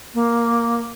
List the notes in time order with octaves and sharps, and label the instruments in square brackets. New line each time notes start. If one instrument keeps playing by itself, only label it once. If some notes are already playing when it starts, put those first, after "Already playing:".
[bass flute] A#3